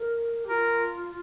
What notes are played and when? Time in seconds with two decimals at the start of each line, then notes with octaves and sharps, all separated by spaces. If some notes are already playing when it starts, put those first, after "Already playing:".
Already playing: A#4
0.44 G4
0.49 F4 A#4